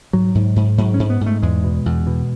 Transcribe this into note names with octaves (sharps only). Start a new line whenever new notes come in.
G#2 F#3
G#2
G#2
G#2 F#3
C#4
G#2
B3
G#2
A3
E2 G#3
B2
E2
B2